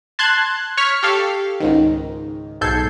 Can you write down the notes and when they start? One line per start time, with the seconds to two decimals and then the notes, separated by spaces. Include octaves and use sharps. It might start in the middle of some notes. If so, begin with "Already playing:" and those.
0.19 A5 C6 F#6 G#6
0.77 C#5 C#6 F6 B6
1.03 G4 A4 F5
1.60 C#2 G#2 D#3
2.61 B1 G#2 A4 G6 G#6 C7